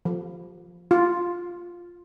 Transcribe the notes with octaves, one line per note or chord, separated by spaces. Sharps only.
F3
F4